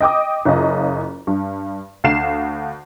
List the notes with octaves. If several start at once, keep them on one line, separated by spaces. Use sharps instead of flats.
D#5 G5 D6 D#6
F#1 C#4 F4 D#5
G2
D2 F5 C7 E7